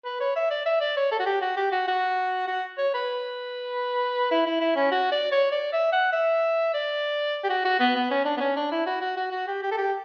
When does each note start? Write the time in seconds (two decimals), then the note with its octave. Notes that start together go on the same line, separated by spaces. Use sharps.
0.05 B4
0.20 C#5
0.36 E5
0.50 D5
0.65 E5
0.81 D5
0.97 C#5
1.11 A4
1.20 F#4
1.26 G4
1.42 F#4
1.57 G4
1.72 F#4
1.87 F#4
2.48 F#4
2.78 C#5
2.94 B4
4.31 E4
4.46 E4
4.60 E4
4.76 C#4
4.91 F#4
5.12 D5
5.32 C#5
5.52 D5
5.73 E5
5.92 F#5
6.12 E5
6.74 D5
7.44 G4
7.49 F#4
7.65 F#4
7.80 B3
7.96 B3
8.10 C#4
8.25 D4
8.37 B3
8.40 C#4
8.56 D4
8.71 E4
8.86 F#4
9.01 F#4
9.17 F#4
9.31 F#4
9.47 G4
9.63 G4
9.71 A4
9.77 G4